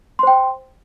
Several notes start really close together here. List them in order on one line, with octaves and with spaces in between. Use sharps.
C6 C5 G5